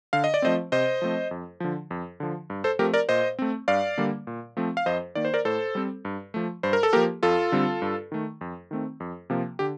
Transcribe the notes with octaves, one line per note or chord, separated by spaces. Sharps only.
D3 F5
D#5
D5
F3 A3 C4 C5 D#5
C3 C5 D#5
F3 A3 C4
F2
D3 F3
F2
D3 F3
G2
A4 C5
F3 A3 C4 G4 A#4
A#4 D5
A#2 C5 D#5
A3 C4
G2 D5 F5
D3 G3 A#3
A#2
F3 A3 C4
F5
F2 C5 D#5
D#3 A#3 D5
C5
A#4 D5
A2 A4 C5
G3 C4
G2
F3 A3
G2 C5
A#4
A4
F3 A#3 G4 A#4
F2 F4 A4
D3 G3 C4
G2
D#3 A3
F2
D#3 A3 C4
F2
C3 F3 A#3
D3 G4